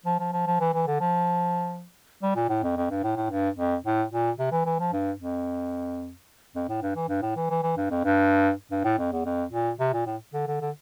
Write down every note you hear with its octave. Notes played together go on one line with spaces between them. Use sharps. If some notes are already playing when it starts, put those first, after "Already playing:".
F3
F3
F3
F3
E3
E3
D3
F3
G3
A#2
A2
F2
F2
G2
A2
A2
G2
F2
A2
A#2
C3
E3
E3
F3
G2
F2
F2
A2
G2
E3
G2
A2
E3
E3
E3
G2
F2
G2
G2
A2
F2
E2
F2
A#2
C3
A#2
A2
D3
D3
D3